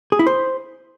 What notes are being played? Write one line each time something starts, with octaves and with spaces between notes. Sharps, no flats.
G#4
E4
C5